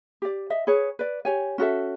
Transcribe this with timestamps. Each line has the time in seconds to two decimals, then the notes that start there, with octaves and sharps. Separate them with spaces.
0.22 G4 D5
0.50 D#5 E5
0.67 G#4 B4 C#5
0.99 B4 D5
1.25 G4 C#5 G#5
1.58 C#4 F#4 A4 E5